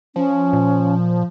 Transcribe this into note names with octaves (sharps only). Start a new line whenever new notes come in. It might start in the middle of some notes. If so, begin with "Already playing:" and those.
F3 C#4
A#2